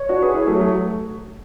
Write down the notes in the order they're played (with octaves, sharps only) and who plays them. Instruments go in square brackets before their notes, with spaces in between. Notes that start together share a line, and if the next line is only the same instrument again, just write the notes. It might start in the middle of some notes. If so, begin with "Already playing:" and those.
Already playing: [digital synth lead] C#5
[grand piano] D4 F#4
G#4 B4
E4 G#4
F#3 A3
F#3 A3